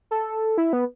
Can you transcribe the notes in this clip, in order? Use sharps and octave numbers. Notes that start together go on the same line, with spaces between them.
A4
E4
B3